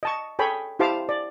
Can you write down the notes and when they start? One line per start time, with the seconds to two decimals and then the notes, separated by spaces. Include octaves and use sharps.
0.03 D#5 A5 C#6
0.39 G#4 A4 C#5 G5 B5
0.79 E4 G4 C5 F5 A5 D6
1.09 D5